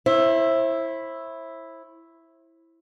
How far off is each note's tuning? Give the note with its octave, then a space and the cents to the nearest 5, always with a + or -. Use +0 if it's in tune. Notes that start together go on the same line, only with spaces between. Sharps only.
E4 +0 C5 +40